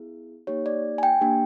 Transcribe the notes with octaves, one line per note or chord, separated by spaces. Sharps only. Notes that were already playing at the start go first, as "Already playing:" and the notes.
Already playing: B3 E4 G#4
A#3 D#4 G4 C#5
D5
G#5
G5
A#3 D4 G4